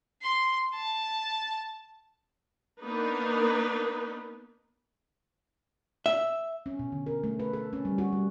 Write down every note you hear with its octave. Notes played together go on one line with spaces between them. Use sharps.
C6
A5
A#3 B3 D4 D#4 A#4 B4
E5
C#4
B2
D3
A#4
A3
B4
A4
C#4
G3
F#4
G3